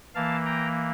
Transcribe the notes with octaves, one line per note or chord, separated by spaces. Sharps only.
E3 A#3 F5 A5
G5 A#5